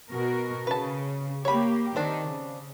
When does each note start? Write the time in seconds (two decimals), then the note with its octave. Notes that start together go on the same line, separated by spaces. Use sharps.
0.10 B2 F#4 A#4
0.67 C#3 B4 A5
1.45 A#3 G4 C#5 B5
1.96 D#3 C4 D4
2.28 C#3